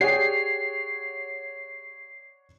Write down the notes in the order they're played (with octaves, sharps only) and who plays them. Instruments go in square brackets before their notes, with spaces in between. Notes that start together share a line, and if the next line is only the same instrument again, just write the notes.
[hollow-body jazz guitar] G4 G#4 [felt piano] C#5 D5 F#5 [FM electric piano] C7